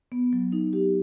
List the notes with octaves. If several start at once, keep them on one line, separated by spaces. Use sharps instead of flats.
B3
F#3
D#4
G4